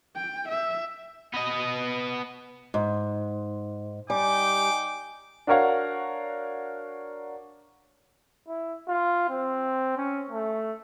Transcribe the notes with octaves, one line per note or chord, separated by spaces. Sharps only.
G5
E5
B3 D#5
G#2
G3 D#4 G5 G#5 D6
D4 F#4 A#4 C#5 F5 F#5
E4
F4
C4
C#4
A3